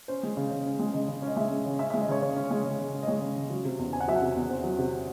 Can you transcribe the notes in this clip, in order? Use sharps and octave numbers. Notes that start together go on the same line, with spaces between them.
C#4 C5
G#3
C#3
C#3
C#4
G#3
C#3 D#5
C#3
C#4
D#5
G#3 E5
C#3
C#3
C#4 E5
E5
G#3
D#5
C#3 C#5
C#3 C#5
C#4
G#3
C#3
C#3
C#4
D#5
G#3 C#5
C#3
C#3
F#3
C3
E2
C4 G#5
F#5
F#3 E5
F#5
C3
E2
C4
F#3
C3